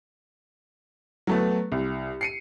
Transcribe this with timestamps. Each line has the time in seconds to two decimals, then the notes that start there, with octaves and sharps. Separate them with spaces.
1.27 F#3 A3 B3
1.72 C2
2.21 C7 C#7 D#7